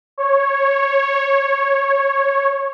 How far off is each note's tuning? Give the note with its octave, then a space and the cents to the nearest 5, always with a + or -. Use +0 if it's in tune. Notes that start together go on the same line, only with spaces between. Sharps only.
C#5 -10